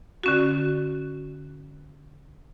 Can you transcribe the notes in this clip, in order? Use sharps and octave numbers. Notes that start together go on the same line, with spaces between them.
D3 C#4 F#4